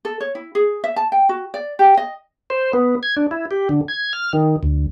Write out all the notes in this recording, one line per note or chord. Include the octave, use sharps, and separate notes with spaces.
A4
C#5
E4
G#4
E5
A5
G5
F#4
D5
G4
D#5
C5
B3
G#6
D4
E4
G4
D3
G#6
F6
D#3
D2